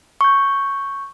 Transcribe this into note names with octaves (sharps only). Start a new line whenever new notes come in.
C#6 G6